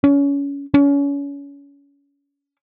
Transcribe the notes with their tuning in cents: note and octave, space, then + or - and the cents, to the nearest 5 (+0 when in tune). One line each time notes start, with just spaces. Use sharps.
C#4 +25
C#4 +30